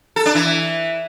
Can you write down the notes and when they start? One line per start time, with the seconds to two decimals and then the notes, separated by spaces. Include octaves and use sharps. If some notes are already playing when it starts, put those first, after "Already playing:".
0.16 A4
0.26 D4
0.35 E3